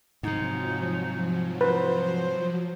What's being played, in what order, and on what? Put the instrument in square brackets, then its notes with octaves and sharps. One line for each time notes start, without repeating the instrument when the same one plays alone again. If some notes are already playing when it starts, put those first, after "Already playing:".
[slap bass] G#2 C3 [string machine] F3 F#3 [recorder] D#4
[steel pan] B4 [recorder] C5